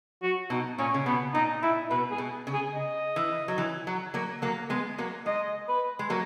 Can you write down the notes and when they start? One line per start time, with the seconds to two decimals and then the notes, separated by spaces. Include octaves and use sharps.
0.23 F#4
0.50 B2 D#4
0.79 A#2 C#4
0.94 C#3
1.06 B2 B3
1.34 A#2 D#4
1.63 A#2 E4
1.90 B2 B4
2.11 G#4
2.18 B2
2.47 C#3
2.53 G#4
2.74 D#5
3.16 E3
3.48 F#3
3.58 E3
3.87 F#3
4.14 F#3 A#3
4.42 F#3 A#3
4.70 G#3 B3
4.98 F#3 A#3
5.26 G#3 D#5
5.68 B4
5.99 G#3
6.10 F#3 A#3